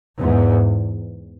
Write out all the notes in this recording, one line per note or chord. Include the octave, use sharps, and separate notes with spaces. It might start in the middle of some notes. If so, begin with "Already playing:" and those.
E2 G#2